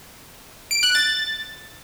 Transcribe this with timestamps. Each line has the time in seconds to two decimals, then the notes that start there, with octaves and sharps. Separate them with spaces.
0.71 D7
0.83 F#6
0.95 A6